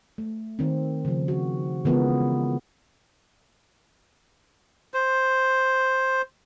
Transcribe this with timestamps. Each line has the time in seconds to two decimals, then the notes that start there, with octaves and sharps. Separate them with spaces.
0.18 A3
0.59 D#3 C4
1.05 C#3 F3
1.28 F#4
1.85 C#3 E3 G#3 B3 F4 A#4
4.94 C5